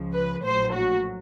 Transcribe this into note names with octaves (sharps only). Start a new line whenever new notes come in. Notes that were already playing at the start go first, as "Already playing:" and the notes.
Already playing: C#2 C#3 F3
B4
A#1 A2 F#3 C5
F#4